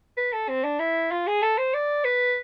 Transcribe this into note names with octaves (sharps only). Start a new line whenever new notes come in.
B4
A4
C4
D4
E4
F4
G#4
A4
C5
D5
B4